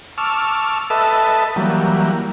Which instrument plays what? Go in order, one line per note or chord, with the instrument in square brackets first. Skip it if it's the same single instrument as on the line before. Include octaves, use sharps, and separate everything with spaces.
[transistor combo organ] A5 C#6 D6 E6 F6
A4 B4 D#5 E5 A5
E3 F#3 G3 A#3